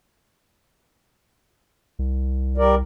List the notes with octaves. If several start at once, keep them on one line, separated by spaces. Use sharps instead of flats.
C2
G3 A#4 D5